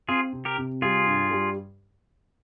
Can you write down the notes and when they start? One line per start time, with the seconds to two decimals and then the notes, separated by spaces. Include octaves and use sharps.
0.08 C4 F4 G#4
0.33 C3
0.45 G4 A#4
0.58 C3
0.82 G3 F4 G#4
1.07 G2
1.31 G3